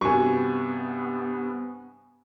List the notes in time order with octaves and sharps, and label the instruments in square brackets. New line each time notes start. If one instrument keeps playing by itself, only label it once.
[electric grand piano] G2 C3 [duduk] B3 [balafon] F#4 A#4 [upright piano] G#5 C#6